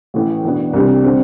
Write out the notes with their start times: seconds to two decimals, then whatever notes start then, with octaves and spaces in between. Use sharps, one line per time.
0.14 A1 A2 E3
0.43 E2 B2 B3 D4
0.73 C2 C3 G3 D4 G4
1.04 D3 G3 C4